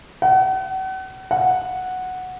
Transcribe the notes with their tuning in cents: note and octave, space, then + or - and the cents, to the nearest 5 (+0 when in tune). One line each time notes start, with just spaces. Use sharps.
F#5 +40
F#5 -5